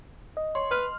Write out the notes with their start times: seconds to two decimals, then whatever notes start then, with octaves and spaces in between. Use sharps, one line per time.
0.37 D#5
0.55 C#5 C6
0.71 B4 F6